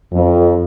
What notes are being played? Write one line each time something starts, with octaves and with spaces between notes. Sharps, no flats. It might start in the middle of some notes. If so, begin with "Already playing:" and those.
F2